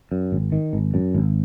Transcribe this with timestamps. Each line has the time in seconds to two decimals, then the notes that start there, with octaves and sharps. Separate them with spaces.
0.12 F#2
0.32 G#1
0.52 D#3
0.73 G#1
0.94 F#2
1.15 G#1